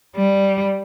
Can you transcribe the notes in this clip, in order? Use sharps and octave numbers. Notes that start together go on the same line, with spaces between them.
G3